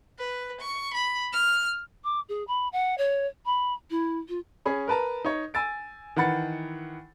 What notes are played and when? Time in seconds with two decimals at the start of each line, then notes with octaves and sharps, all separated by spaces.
0.18 B4
0.60 C#6
0.94 B5
1.33 F6
2.04 D6
2.29 G#4
2.48 B5
2.72 F#5
2.98 C#5
3.45 B5
3.90 E4
4.29 F4
4.66 C#4 G#4 B5
4.88 A#4 B4 A5 A#5
5.25 D#4 C#5
5.54 G#5 E6 A6 D7
6.16 D#3 E3 F#5 B5 A6 C#7